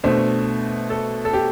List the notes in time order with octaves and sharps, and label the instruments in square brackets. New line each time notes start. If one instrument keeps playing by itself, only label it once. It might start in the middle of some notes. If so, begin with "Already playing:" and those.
[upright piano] B2 A3 D4 C5
A4
A4
G4